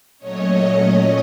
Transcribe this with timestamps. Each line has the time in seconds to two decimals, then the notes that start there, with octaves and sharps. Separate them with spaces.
0.18 A#2 F#3 A3 C#4 C#5 D#5